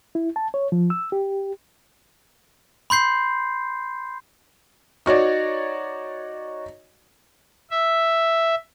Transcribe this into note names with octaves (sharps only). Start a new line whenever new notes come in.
E4
A5
C#5
F3
E6
G4
B5 C6 G6 C7
D#4 F#4 C#5 D5
E5